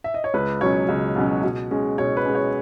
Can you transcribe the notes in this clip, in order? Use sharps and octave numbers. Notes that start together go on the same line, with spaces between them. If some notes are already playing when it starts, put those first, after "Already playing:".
E5
D#5
C#5
C#2 B4
B2 F#3 C#4 C#5
C#2
B2 F#3 C#4
B2
G#3 C#4
B2 C#5
B4
G#3 C#4
C#5